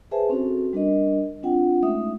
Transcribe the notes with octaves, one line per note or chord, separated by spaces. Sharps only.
G#4 B4 C5 E5 G#5 A5
C4 C#4 F#4 A4
G3 D4 A#4 D#5
C4 D4 F4 F#5 G5
G#3 A3 C#4 D#4 E5 D#6